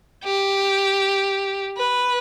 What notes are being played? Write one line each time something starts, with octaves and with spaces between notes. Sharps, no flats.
G4
B4